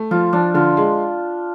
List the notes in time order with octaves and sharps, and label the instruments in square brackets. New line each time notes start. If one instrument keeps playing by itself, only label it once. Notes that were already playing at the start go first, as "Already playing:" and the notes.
Already playing: [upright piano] A3
[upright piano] F3 [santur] F4
[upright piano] F3 [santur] D4
[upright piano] D3 [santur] F4
[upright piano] G#3